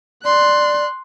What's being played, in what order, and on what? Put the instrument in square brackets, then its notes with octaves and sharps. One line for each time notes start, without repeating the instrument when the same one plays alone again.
[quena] D5 [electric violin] C6 F#6